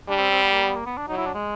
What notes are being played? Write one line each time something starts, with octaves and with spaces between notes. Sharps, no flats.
G3 D4
C4
C4
B3
A#3
B3
A#3
B3
D4
F#3 D#4
E4
D4
G#3